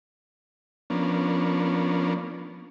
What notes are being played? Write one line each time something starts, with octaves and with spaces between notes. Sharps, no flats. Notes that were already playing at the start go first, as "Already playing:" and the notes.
F3 A#3 B3 C#4 D4